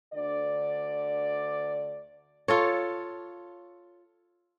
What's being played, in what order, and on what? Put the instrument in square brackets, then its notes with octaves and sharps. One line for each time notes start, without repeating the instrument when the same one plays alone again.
[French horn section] D2 D3 D5
[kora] F4 A4 C#5